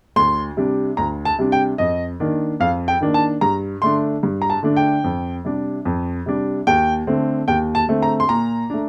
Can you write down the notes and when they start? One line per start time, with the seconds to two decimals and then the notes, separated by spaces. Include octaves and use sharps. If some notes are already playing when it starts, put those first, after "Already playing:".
0.16 D2 C6
0.57 C3 G3 D4
0.97 D2 A#5
1.25 A5
1.39 C3 G3 D4
1.52 G5
1.78 F2 D#5
2.20 D#3 A#3 D4
2.60 F2 F5
2.88 G5
3.01 D#3 A#3 D4
3.14 A5
3.41 G2 A#5
3.82 D3 A3 D4 C6
4.23 G2
4.42 A#5
4.50 A5
4.63 D3 A3 D4
4.77 G5
5.04 F2
5.45 C3 G3 D4
5.85 F2
6.26 C3 G3 D4
6.67 D#2 G5
7.07 D3 A3 C4
7.48 D#2 G5
7.75 A5
7.88 D3 A3 C4
8.02 A#5
8.20 C6
8.29 A#2 A#5
8.70 A3 D4